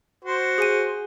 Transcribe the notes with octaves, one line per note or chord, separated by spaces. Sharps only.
F#4 C5
G#4 G#5 D#7